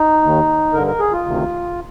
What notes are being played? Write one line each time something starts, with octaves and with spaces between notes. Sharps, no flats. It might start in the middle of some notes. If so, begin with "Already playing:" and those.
Already playing: D#4
D#2 D#3
G2 D3 A#4
A#4
G#4
F4
D2 C3 D#3